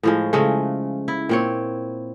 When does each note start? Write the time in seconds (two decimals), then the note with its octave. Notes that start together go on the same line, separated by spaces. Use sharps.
0.03 A2 F3 G#3
0.33 C#3 G#3 A3
1.08 E4
1.29 A#2 C4 C#5